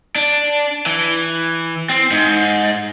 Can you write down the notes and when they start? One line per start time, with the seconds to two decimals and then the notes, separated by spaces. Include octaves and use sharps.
0.15 D4
0.86 E3
1.89 C4
2.11 G#2